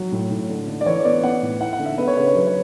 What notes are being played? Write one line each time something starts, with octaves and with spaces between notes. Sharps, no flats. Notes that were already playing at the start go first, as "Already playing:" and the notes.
Already playing: F#3
A2
A2
D3
D3
D5
E3 C#5
B3 D5
B3 F#5
A2
E4 F#5
F#5
D3
E5
B3 B4
C#5
C#3 B4
C#5
F#3 B4
C#5